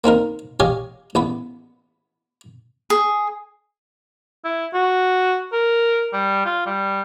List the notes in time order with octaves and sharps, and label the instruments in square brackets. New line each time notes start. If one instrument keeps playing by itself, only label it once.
[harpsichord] A#3 C4 D#4 A#4
G4 C#5 D#5 F5 G#5
A1 B3 B5
[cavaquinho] G#4
[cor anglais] E4
F#4
A#4
G3
F4
G3